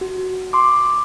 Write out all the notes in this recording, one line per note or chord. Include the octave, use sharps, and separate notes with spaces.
F#4
C6 D6